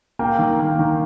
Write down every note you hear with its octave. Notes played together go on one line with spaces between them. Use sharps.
A#3 G5
D#3
A#3
D#3